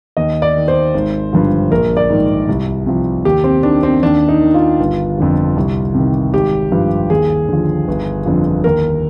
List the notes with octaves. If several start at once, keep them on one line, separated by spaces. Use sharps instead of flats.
D#2 D#5
D5
D#3
C5
G#1
G2 D3 F3
A#1 A#4
D5
G#2 D#3
C2
C3 F3
D#2 G4
C4
D#3 D4
C4
D#2 D4
D#4
D#3
F4
G1
F2 D3 F3
C2
C3 D#3
G#1 G4
G2 F3
D#2 G#4
D3 F3
G1
F2 D3 F3
D#2 A#4